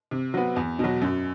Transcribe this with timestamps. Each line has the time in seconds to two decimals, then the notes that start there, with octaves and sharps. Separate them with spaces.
0.11 C3
0.34 F#3 B3
0.56 E2
0.79 B2 F#3
1.02 F#2